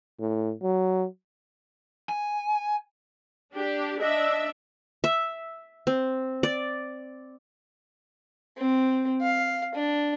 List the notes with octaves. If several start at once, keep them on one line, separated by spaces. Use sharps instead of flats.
A2
F#3
G#5
D4 G4
D4 D#5 E5
E5
C4
D5
C4
F5
D4